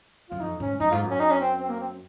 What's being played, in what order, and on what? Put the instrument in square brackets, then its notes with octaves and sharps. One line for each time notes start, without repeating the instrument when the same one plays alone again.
[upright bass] F#2 [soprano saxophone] F4
[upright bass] F2 [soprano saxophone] D#4
[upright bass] G#2 [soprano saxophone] C#4
[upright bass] F#2 [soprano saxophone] D#4
[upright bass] G#2 [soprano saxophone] F4
[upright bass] F#2
[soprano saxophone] C#4
D#4
C#4
C4
C4
A#3
C4